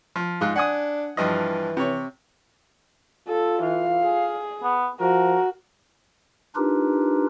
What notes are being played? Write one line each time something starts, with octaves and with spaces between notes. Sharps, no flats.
F3
G#2 F4 F#6
D4 F#5 G#5 D#6
G2 E3 F3 D#5
C3 C#5
F4 A4
E3 F5
G#4
B3
F3 F#4 A#4
D4 D#4 F4 G4 A#4 B4